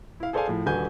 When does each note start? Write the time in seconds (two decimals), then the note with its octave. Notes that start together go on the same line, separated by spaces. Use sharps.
0.20 E4 F5
0.33 G#4 A4 C5 D5 F5 G#5
0.47 A2 F3
0.66 D#1 D3 F#4 B4 G#5 G6